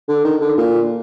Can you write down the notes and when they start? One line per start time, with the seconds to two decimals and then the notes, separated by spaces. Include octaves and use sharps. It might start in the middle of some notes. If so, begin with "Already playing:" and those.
0.08 D3
0.25 D#3
0.41 D3
0.58 A#2